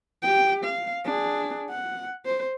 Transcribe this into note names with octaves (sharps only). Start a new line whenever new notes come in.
G4 G5
F5
D4 G#4
F#5
C5